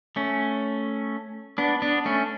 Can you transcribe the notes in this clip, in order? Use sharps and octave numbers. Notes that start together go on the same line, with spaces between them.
A3 C#4
B3 D4
B3 D4
A3 C#4